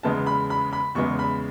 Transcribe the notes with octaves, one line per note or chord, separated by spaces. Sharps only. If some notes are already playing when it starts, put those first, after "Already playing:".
E2 C#3 G#3 B3 A5
B5
B5
B5
E2 C#3 G#3 B3 C#6
B5